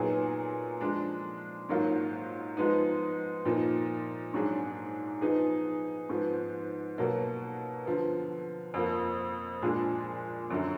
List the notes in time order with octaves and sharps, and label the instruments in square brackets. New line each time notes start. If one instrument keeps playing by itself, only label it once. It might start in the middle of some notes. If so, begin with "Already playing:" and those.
Already playing: [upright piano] A#2 F#3 B3 D#4 G#4
F3 G#3 D4
G#2 D#3 F#3 A#3 F4
F3 G#3 B3 D#4
A#2 F3 A#3 D#4
G#2 F#3 D4 G#4
F3 B3 D#4 G#4
G#2 F3 B3
B2 F#3 A#3
D3 F3 B3
F2 F3 A#3
A#2 F3 G#3 D4 G#4
F#2 D3 F#3